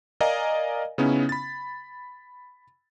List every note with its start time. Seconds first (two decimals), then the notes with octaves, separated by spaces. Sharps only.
0.20 A#4 D5 D#5 F5 G#5 A#5
0.98 C#3 B3 C#4 D#4 E4
1.29 B5 A6